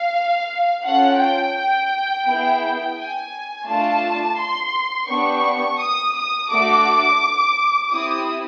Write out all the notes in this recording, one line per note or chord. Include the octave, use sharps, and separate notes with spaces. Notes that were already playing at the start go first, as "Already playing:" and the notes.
Already playing: F5
C#4 F4 A4 F#5
G5
B3 E4 G#4
G#5
A3 D4 F4 A5
C6
B3 D4 G4 C#6
D#6
D#6
A3 D4 F#4 A4 D6
C4 E4 G4 D#6